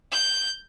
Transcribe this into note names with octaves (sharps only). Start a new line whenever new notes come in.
G6